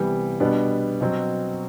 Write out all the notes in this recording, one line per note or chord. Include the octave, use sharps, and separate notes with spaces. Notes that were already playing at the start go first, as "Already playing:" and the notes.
Already playing: C2 C3 E3 G3 B3
B2 G3 B3 D4
B2 F#3 C4